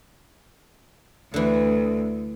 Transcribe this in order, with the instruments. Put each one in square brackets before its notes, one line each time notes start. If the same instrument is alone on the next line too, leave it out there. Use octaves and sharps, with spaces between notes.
[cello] D2 [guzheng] D3 E3